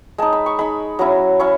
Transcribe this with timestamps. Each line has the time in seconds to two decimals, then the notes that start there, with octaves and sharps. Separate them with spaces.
0.18 G#3 D#4 A5
0.33 B5
0.46 C#6
0.59 G#3 D#4 B5
0.99 F#3 C#4 E4
1.39 C#4 E4 C#6